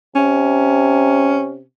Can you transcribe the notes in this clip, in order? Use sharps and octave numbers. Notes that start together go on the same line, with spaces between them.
C3 C#4